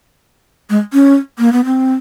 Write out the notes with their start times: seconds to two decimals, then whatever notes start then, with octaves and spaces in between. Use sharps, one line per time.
0.70 G#3
0.93 C#4
1.39 A#3
1.53 B3
1.65 C4